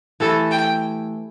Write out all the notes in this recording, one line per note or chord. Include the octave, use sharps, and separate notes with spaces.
E3 A3 E4 G4 A4
G5